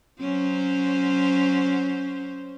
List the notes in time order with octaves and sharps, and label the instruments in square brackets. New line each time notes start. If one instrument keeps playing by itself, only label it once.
[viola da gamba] F#3 C#4 C5